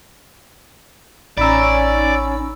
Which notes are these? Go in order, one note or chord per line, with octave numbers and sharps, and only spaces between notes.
A1 C#4 D#4 D5 A#5 B5 E6